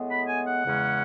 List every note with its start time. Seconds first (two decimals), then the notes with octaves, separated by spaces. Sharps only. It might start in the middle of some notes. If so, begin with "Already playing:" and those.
Already playing: A2 G#3 B3
0.11 B5
0.28 G#5
0.47 F#5
0.65 E2 C#3 G#3 C#4